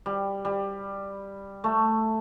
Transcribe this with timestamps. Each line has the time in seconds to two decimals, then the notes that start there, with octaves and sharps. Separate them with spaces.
0.06 G3
0.45 G3
1.64 A3